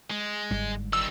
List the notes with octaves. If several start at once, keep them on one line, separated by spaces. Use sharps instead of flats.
G#3
G1 G#2 G3
D#3 G3 E6